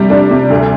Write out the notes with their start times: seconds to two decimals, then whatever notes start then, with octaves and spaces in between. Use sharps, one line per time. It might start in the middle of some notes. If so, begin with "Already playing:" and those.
Already playing: C3 G3 D4
0.10 D4
0.31 C3
0.50 D2